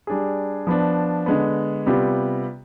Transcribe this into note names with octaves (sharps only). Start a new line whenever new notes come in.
G3 D4 G#4
F3 B3 D4
D3 G#3 B3
C3 G3 B3 F4